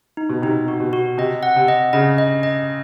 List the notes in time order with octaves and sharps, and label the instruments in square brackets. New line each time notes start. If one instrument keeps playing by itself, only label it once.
[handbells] D#4
[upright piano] B2
[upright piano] C3 [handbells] D#4
[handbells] F#4
[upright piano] B2
[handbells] F#4
[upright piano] C3 [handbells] D#5
[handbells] F#5
[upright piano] C3
[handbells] D#5
[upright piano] C#3 [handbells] D#5
[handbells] D#5
D#5